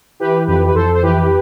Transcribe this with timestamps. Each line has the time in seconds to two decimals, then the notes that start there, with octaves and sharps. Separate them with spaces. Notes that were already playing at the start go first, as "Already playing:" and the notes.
0.20 E3 G4 B4
0.47 F2 G4 B4
0.68 B4
0.74 F2 A4 C5
0.95 C5
1.03 E3 G4 B4